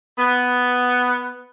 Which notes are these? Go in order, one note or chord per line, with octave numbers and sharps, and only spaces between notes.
B3